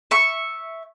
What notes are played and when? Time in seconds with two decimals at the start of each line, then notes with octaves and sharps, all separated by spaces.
0.11 E5 C#6